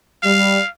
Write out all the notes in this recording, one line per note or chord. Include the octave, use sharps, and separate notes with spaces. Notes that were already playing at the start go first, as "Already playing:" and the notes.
G3 F5